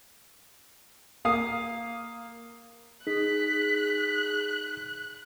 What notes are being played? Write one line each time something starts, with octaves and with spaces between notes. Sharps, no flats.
A#3 F5 D#6 C7
D#4 G#4 F#6 B6